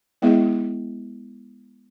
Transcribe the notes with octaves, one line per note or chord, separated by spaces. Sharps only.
G#3 B3 E4 G#4 D#5 E5